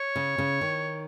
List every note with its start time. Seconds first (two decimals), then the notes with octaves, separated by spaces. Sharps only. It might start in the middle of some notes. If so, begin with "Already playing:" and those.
Already playing: C#5
0.16 C#3
0.38 C#3
0.61 D#3